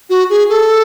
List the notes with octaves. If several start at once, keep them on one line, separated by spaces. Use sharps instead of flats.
F#4
G#4
A4